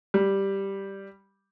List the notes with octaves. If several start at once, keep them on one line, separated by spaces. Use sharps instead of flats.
G3